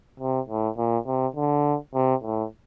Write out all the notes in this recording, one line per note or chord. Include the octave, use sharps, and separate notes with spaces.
C3
A2
A#2
C3
D3
C3
A2